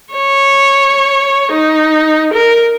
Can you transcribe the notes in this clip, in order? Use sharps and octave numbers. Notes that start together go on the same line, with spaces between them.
C#5
D#4
A#4